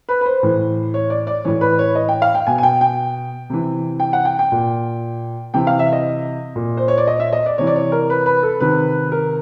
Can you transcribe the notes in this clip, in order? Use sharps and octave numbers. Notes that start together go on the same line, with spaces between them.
B4
B4
C5
A2 E3
C#5
D5
D5
A2 E3 C#5
B4
C#5
D#5
G5
F5
G5
B2 G#5
G#5
G5
G5
C3 E3
G5
F#5
G5
G5
A#2
C3 E3 G5
F5
E5
D#5
A#2
C5
C#5
D5
D#5
E5
D#5
D5
C3 E3 C#5
D5
C#5
A#4
B4
B4
A4
C3 D#3 B4
A#4